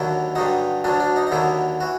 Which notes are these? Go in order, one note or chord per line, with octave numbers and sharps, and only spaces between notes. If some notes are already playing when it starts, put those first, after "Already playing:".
Already playing: D#2 D3 F#3 E4
G2 D3 F#3 D#4
D2 D3 F#3 D4
D4
D#4
D#4
D#2 D3 F#3 E4
E3 F#4